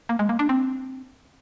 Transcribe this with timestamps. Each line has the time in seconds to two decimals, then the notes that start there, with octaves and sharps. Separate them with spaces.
0.09 A#3
0.19 G#3
0.29 A#3
0.39 D4
0.49 C4